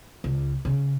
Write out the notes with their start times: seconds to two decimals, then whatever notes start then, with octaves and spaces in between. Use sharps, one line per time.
0.24 C#2
0.65 C#3